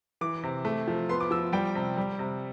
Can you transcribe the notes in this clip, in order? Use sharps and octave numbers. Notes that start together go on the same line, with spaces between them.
E3 D6
C3
A3
F3
B3 C6
D6
F3 E6
G3 G5
C3
G3
C3